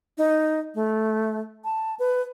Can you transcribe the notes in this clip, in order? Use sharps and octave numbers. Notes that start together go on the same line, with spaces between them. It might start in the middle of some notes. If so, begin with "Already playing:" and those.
D#4
A3
A5
B4